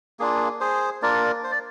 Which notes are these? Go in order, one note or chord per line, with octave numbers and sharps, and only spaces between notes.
A#3 D4 F4 G#4
G#4 C5
A#3 D4 F4 A#4 D5
C5
D5